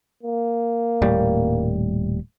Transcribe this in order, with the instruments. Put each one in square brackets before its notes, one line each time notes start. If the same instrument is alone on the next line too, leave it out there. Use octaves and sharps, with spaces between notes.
[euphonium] A#3
[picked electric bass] D#1 A2 G3